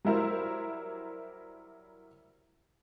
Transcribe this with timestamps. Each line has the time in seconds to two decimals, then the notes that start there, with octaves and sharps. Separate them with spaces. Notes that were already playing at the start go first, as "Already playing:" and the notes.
0.05 F#3 G3 E4 A#4 C5